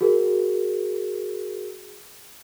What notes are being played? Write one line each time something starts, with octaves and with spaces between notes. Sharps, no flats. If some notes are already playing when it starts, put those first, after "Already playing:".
F#4 G#4 A#4